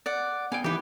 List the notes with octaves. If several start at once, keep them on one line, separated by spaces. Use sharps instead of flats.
D5 F#5
B3 F5 G5 G#5
E3 B3 D#4 G4 B4